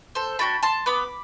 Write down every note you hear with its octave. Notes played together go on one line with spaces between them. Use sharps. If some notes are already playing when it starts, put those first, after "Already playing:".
A4 C5
D4 F#4 A4 G5 B5
A5 C6
B3 B5 D6